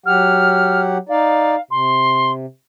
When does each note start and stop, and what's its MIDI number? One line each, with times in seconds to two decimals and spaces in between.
0.06 0.98 54
0.06 0.98 67
0.06 0.98 78
0.06 0.81 89
1.09 1.56 63
1.09 1.56 74
1.09 1.61 77
1.71 2.46 48
1.71 2.32 84